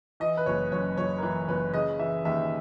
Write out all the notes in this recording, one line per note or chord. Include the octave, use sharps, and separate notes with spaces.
E3 D#5
B4
F#1 C#5
F#2 C#5
F#1 C#5
A#4
E3 B4
F#1 B4
C#3 D#5
E3 E5
D#2 E5